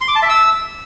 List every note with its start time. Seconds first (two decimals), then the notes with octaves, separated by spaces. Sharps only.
0.01 C6
0.08 D6
0.15 A5
0.22 E5
0.29 E6